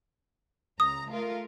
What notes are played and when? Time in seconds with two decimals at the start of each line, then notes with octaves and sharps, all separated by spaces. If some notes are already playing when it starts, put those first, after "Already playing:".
0.80 C#2 A#5 D#6
1.09 A3 F4 A#4